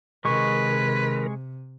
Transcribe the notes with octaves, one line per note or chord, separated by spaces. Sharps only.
C3 D#3 G#3 A#4 B4 C#6